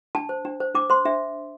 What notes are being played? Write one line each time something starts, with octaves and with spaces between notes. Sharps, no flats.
D4 A5
C5
D4
C5
D4 D6
C5 C6
D4 E5